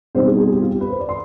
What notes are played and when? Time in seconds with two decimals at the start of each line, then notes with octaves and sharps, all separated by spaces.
0.15 B2 G3 C4 D#4 C5
0.27 G#4
0.40 G#4
0.52 G4
0.62 F4
0.71 G4
0.81 B4
0.90 C5
1.00 D5
1.09 C6